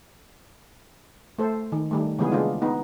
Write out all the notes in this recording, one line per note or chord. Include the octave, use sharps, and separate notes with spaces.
A3 A4 C5
D#3
D#3 G3 A3
C#3 E3 G3 G#3 B3 G#4
C#3 G#3 A#3 D4 F4
B3 D#4